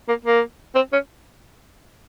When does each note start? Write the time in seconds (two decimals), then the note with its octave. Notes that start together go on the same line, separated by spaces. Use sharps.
0.08 A#3
0.25 A#3
0.75 C4
0.93 C#4